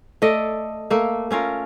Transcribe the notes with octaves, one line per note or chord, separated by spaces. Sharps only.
A3 A4 D5 D#5
A3 A#3
A3 C#4 F4 A#4